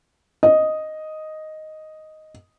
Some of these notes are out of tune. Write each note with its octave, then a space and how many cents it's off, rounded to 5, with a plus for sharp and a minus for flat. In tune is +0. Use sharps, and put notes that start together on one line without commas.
D#5 +0